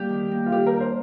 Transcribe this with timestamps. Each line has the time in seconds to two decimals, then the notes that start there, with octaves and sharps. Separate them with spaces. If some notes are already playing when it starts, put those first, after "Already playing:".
Already playing: G3 A#3 G4
0.09 D#3
0.31 A#3
0.46 F4
0.51 D#3 G4
0.66 A#4
0.74 D4
0.80 C5